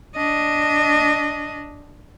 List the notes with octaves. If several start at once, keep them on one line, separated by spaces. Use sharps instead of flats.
D4 D#5